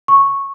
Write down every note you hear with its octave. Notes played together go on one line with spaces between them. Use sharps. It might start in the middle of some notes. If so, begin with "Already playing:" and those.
C#6